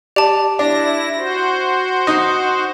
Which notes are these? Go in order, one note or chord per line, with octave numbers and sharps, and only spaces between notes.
G4 D5 A5
D4 E4 A#6
F#4 C5
D#4 D#5